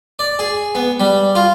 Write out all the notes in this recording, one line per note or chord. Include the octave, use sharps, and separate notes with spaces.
D5
G#4
B3
G3
F4